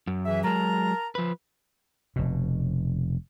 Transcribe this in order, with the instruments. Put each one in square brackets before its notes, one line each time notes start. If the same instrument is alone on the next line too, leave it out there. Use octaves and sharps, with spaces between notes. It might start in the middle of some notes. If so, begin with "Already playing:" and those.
[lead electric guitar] F#2
[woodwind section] E3 G#4 E5
[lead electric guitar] F#3 G#3 [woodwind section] A#4 A5 A#5
[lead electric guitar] F3 B4
[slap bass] F1 B2